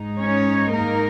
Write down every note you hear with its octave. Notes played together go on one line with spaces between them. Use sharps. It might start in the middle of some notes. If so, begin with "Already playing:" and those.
Already playing: G#2 G#3 D#4
C#4 C#5
A#3 A#4